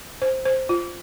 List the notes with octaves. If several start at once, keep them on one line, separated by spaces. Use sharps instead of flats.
C5
C5
F4